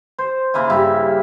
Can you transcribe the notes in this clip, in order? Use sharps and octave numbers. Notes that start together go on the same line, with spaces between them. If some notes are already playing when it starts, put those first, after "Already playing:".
C5
C#3 A#3 E4 G#5
G2 C#3 G3 E5